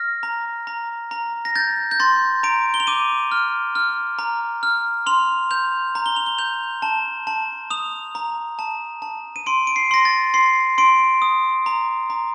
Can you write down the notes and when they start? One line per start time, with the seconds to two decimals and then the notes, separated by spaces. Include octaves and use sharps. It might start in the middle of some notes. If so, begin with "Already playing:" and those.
Already playing: F6 A#6
0.23 A#5
0.67 A#5
1.11 A#5
1.45 A#6
1.55 G6 A6
1.91 G6
2.00 C6 A6
2.43 A#5 D7
2.74 G7
2.80 F7
2.87 D6 D#7
3.32 F6
3.75 F6
4.19 A#5
4.63 F6
5.06 C6 F7
5.51 G6 F7
5.95 A#5
6.06 G7
6.16 F7
6.26 G7
6.39 G6 F7
6.82 A5
7.27 A5
7.70 D#6 F7
8.15 A#5
8.59 A5
9.02 A5
9.36 D#7
9.46 C6 D7
9.67 D7
9.76 C7
9.91 C6 A#6
10.05 A6
10.34 C6 C7
10.78 C6 D7
11.22 D#6
11.66 A#5
12.10 A#5